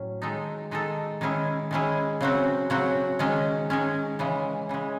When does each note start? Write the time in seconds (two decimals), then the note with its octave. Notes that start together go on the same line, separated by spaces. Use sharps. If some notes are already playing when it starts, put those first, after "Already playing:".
Already playing: A2 F#3 C#4
0.22 D#3 G#3 D#4 A4
0.71 D#3 G#3 D#4 A4
1.21 D#3 G#3 C#4 E4 G#4
1.71 D#3 G#3 C#4 E4 G#4
2.21 C#3 F#3 C4 F#4
2.70 C#3 F#3 C4 F#4
3.19 D#3 G#3 C#4
3.70 D#3 G#3 C#4
4.19 C#3 E3 G#3
4.69 C#3 E3 G#3